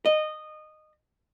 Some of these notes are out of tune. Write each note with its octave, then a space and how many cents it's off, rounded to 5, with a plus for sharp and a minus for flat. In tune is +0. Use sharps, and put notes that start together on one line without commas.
D#5 -15